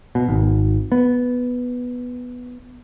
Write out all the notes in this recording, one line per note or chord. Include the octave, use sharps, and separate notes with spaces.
B2
G#1
B3